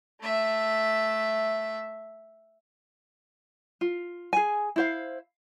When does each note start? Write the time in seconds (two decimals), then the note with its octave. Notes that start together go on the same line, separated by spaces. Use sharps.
0.21 A3 E5
3.81 F4
4.33 G#4 G#5
4.76 E4 C5 F5